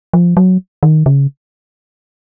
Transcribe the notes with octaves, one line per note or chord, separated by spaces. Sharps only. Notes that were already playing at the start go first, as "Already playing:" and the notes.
F3
F#3
D#3
C#3